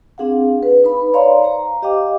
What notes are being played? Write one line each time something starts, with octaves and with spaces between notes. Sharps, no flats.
C4 D4 G#4 F5 F#5
B4
D#4 B4 B5
C#5 D5 F5 A#5 C6
C5 A#5
G4 D#5 F5 G5 D6